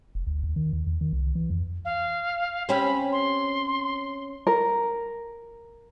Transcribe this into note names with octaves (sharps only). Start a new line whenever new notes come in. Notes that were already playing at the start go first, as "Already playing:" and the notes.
F1
D2
D#2
D#3
D#2
E2
D#3
C2
E3
F2
F5
C4 C#4 G4 B5
C6
A#4